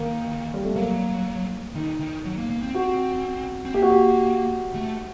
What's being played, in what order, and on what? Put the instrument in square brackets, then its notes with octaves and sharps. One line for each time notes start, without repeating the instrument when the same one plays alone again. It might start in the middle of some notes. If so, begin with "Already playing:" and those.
Already playing: [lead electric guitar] D#3 [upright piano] A#3
[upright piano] G3
A3
[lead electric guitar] F#3 [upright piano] A#3
[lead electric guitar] D#3 [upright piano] D#4
[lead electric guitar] D#3
F#3
A#3
A#3
C4
[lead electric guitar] C4 [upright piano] F#4
[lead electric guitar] C4
[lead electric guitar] A#3 [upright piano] G4
[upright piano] F#4
G4
[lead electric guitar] A3